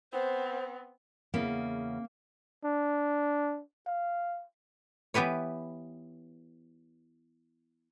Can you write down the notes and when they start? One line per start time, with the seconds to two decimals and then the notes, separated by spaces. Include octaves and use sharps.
0.12 B3 C4 C5
1.34 E2 C#3 A#3 B3
2.64 D4
3.87 F5
5.14 E3 B3 G4 B4 C#5